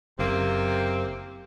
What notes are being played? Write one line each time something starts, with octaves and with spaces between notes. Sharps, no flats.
F#1 C3 A#3 C4